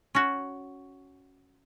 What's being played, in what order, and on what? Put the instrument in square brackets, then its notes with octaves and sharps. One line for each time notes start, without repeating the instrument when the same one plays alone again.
[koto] C#4 F#4